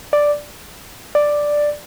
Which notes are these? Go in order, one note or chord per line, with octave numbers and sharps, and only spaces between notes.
D5
D5